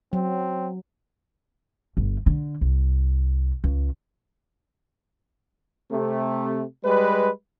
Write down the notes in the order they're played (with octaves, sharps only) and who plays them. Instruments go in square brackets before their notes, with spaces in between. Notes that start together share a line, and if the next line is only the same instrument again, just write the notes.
[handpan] F#3 [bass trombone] C4
[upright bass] G1
D3
C2
C#2
[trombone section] C3 A3
G3 G#3 B4